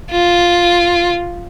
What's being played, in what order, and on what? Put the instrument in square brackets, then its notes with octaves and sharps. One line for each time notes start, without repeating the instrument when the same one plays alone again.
[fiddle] F4